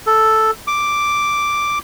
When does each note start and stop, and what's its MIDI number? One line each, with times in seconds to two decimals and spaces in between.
0.07 0.51 69
0.67 1.79 86